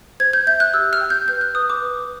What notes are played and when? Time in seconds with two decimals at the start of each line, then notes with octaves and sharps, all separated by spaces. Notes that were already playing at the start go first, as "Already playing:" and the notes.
0.20 C5 G#6
0.33 G6
0.47 E5 G6
0.60 F#6
0.74 G4 E6
0.93 F6
1.01 G5
1.10 G6
1.28 B4 G6
1.41 F#6
1.55 B4 D#6
1.70 D6
1.82 B4